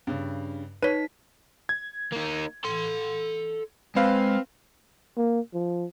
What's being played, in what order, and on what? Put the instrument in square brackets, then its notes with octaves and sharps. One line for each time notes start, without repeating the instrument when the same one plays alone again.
[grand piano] G2 C#3
[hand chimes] D#4 B6 [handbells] B4 C#5 [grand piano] D#7
[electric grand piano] G#6
[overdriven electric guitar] A#3 D#4
A4 C6
[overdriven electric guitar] G#3 [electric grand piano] C4 B4 F5
[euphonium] A#3
F3